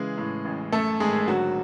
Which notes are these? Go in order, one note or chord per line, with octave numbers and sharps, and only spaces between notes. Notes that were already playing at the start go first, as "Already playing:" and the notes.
Already playing: C#3 E3 G#3 G#4
A2
A1
F#2 A3 A4
G#1 G#3 G#4
D3 F#3 F#4